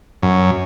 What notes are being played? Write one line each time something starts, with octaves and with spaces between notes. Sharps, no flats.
F#2